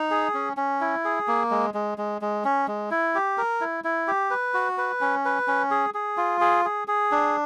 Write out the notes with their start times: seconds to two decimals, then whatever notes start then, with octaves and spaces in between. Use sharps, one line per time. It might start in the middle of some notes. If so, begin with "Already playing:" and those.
Already playing: D#4
0.11 G#4
0.34 C#4
0.57 C#4
0.81 E4
1.05 G#4
1.28 A#3
1.51 G#3
1.74 G#3
1.98 G#3
2.22 G#3
2.45 C#4
2.68 G#3
2.91 E4
3.15 G4
3.38 A#4
3.61 E4
3.84 E4
4.08 G4
4.30 B4
4.54 F#4
4.78 B4
5.01 C#4
5.25 B4
5.48 C#4
5.71 G#4
5.94 G#4
6.17 F4
6.41 G#4
6.65 G#4
6.88 G#4
7.12 D4